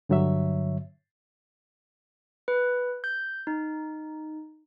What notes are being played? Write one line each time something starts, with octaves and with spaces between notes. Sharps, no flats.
G2 D3 F#3 C#5 E5
B4
G6
D#4